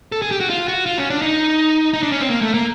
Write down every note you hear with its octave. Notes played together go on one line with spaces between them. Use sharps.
A4
G#4
G4
F#4
F4
F#4
F4
C#4
D4
D#4
D#4
D4
C#4
C4
A#3
A3
A#3